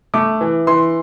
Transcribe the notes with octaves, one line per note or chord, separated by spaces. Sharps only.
A3 D6
E3
E3 C6